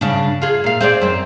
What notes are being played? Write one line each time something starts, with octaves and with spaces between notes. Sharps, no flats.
G2 C#3 D4
F4 G#4
A#2 F5
C4 G#4 D5
F#2 C4